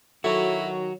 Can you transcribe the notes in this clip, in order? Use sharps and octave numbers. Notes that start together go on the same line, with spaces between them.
D#3 F#3 E4 F#4 A4 C#5